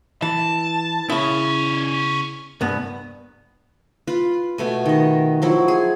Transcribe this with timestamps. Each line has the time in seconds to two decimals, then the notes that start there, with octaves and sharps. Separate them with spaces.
0.22 E3 A5
1.10 C#3 B3 C#4 E4
2.61 C2 G2 B3
4.07 F4 B4
4.58 B2 A3 G#5
4.85 D#3 D#5
5.42 F3 F#3 E4
5.68 G#4